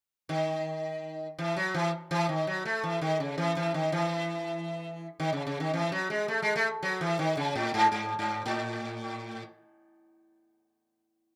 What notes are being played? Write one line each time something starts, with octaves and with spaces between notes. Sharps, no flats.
D#3
E3
F#3
E3
E3
D#3
F#3
A3
E3
D#3
C#3
E3
E3
D#3
E3
D#3
C#3
C#3
D#3
E3
F#3
G#3
A3
G#3
A3
F#3
E3
D#3
C#3
A2
G#2
G#2
G#2
A2